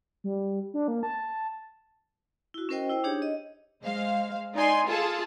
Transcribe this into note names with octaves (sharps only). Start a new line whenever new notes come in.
G3
D4
A#3
A5
E4 F#4
C#4 F#4 A#4 C5 D#5 G5
E4 C5 G5
D4 D#4 G4 G#4 C#5
D#5
G#3 C5 F5
D#4 D5 G#5 C6
F4 G#4 A4 A5